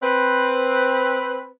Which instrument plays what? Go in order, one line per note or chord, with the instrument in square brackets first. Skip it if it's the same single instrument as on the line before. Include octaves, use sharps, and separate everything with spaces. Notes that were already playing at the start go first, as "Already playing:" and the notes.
[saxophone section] C4 B4